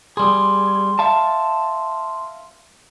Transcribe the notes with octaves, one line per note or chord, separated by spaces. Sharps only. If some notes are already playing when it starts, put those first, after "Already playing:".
G3 G#4 C6
E5 F5 A5